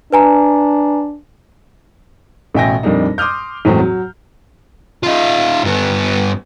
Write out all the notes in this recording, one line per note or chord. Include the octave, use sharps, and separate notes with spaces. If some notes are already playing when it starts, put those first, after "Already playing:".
D4 B4 G#5 A#5
A1 B2 E5 G5 G#5 A#6
F2 A#2 G3 D4 D#4
C6 D6 D#6 F6 G6
E2 A2 F#3 G#3 C4
F#3
D#4 F4
G2 B3